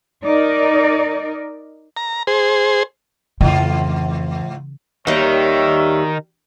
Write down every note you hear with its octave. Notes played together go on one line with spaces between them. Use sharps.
D#4 A#4 D5
A#5
G#4 C5
F2 G#2 C#3 E3 F4
D#2 D#3 G3 D#4 C#5 E5